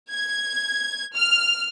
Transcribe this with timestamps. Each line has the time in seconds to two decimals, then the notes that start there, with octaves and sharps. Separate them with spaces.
0.10 G#6
1.15 F6